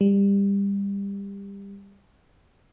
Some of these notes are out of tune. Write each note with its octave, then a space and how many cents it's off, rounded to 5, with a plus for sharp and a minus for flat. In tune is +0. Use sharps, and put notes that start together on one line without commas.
G3 +25